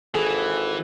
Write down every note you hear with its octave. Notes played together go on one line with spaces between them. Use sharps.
G#1 E3 G#4 A4